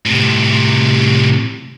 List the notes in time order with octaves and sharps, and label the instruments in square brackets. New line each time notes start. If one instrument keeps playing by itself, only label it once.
[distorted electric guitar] A2 C3